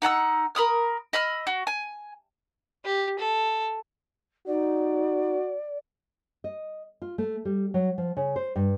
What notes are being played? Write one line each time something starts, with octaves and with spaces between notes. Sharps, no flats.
D#4 F#5 A5 E6
A#4 B5 D#6 F6
D#5 B5 E6 F6
F#4
G#5
G4
A4
D#4 F#4 D5
D#5
F4
A3
G3
F#3
F3
C#3
C5
G2